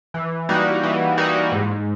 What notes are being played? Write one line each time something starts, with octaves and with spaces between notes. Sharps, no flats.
E3
G3 A#3 D#4 F#4
E3
G3 A#3 D#4 F#4
G#2